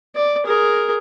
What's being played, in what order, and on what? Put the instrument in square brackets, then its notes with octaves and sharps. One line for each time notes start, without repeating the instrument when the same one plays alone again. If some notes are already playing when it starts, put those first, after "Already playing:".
[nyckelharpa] D5
G#4 A#4